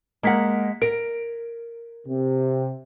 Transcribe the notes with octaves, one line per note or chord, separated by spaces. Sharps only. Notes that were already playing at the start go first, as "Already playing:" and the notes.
G#3 A#3 F#5 B6
A#4 D7
C3